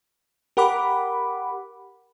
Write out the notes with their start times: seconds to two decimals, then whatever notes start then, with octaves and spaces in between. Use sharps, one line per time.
0.57 G4 A#4 F#5 B5 D6